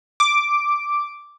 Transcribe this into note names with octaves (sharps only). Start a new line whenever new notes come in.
D6